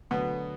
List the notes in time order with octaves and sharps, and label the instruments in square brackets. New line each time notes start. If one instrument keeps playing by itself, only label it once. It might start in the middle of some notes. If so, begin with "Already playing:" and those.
[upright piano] D2 D3 F#3 [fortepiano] B2 B3